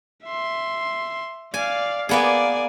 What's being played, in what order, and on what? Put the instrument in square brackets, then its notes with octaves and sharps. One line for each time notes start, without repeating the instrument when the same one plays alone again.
[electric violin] E5 C6
[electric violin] D5 F5 [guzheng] G#5
[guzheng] A#3 B3 G#4 [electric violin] D5 G#5